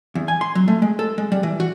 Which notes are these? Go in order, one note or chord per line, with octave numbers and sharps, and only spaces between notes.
E2
G#5
C6
F#3
A3
G#3
A4
G#3
G3
E3
F#4